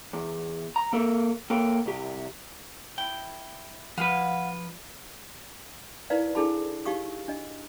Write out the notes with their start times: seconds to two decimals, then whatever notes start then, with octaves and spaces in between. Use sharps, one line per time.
0.13 E2
0.76 A#5
0.93 A#3 A4 A#4
1.50 A#3 A4 A#4 G5
1.86 C2 G4
2.98 E4 G5
3.98 F3 B4 F5 F#5 B5
6.10 D#4 E4 A#4 B4 D5 F5
6.35 D4 E4 G#4 A4 A5 B5
6.85 D#4 G4 F5 C#6 D#6
7.28 D4 D#5